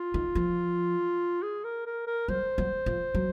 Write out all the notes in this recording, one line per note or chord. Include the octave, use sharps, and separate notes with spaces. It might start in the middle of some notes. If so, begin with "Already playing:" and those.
Already playing: F4
D#3
F3
G#4
A#4
A#4
A#4
F#3 C5
F#3
F3
F#3